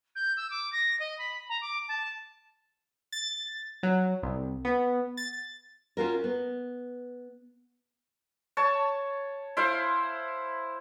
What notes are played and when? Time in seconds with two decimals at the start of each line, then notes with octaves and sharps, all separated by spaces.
0.15 G6
0.37 E6
0.50 D6
0.73 A#6
1.00 D#5
1.19 B5
1.49 A#5
1.61 D6
1.88 A5
3.12 A6
3.83 F#3
4.23 C2
4.65 B3
5.17 A6
5.97 C#4 F4 F#4 A#4
6.24 B3
8.57 C#5 A5
9.57 E4 C5 F5